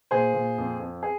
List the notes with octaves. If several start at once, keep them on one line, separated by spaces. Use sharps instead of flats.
A#2 G#4 C5
A#2
F2
F2
G#4